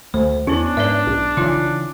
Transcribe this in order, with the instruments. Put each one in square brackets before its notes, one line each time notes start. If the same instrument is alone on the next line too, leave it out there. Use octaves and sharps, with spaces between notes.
[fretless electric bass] D2 [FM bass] A3 [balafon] C5
[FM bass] E2 [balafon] B3 E4 [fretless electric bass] C#4 [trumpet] D4
[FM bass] G#2 [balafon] B4 D5 E5
[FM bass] B1
[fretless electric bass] C#3 E3 [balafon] D#4 F4